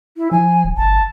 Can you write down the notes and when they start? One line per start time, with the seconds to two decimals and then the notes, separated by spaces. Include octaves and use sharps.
0.18 E4
0.31 F3 G#5
0.64 D1
0.77 G1 A5